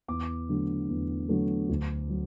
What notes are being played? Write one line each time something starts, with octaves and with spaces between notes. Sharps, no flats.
E2 D6
D3 F#3 A3
E2
D3 F#3 A3
D2
F#3